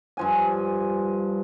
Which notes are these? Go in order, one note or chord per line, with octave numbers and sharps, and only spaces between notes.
G2 F3 G#5